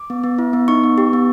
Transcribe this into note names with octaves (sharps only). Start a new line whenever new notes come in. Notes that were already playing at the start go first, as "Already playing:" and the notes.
Already playing: D6
B3
B3
E4
B3
D#4 C#6
B3
G4
B3